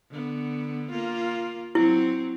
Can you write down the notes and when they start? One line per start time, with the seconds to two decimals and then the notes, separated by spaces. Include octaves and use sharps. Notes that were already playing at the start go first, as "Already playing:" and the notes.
0.11 D3 B3
0.91 A#3 F4
1.75 F#3 C4 E4